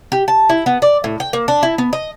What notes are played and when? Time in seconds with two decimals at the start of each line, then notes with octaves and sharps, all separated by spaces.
0.12 G4
0.28 A5
0.49 E4
0.66 B3
0.82 D5
1.04 A2
1.20 G5
1.33 A#3
1.48 D4
1.63 E4
1.78 B3
1.93 D#5